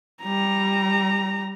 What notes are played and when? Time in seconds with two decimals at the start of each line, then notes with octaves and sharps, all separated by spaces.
0.23 G3 A#5